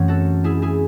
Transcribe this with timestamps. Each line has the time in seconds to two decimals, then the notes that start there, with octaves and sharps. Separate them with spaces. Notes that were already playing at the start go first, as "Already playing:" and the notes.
Already playing: F#2 E3 A3 C4 C#5
0.08 F#4 A4
0.44 E4 G#4
0.62 E4 G#4